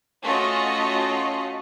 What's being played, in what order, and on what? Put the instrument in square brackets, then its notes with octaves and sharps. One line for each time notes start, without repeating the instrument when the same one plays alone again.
[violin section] A3 C#4 F4 F#4 D#5